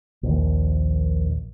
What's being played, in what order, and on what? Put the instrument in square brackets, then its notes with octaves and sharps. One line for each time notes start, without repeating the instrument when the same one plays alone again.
[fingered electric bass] A#1 D#2